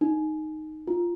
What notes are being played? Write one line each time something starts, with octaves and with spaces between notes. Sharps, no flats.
D#4
F4